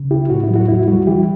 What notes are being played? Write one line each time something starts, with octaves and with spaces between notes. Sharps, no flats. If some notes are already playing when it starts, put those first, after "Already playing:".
Already playing: C#3
C#2 E4 G4
A2 F#4
E4
F#3
F#4
E2 E4
G3 F#4
E3 E4 G4